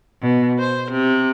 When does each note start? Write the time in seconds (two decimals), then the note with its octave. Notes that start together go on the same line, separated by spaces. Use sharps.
0.22 B2
0.59 C5
0.91 C3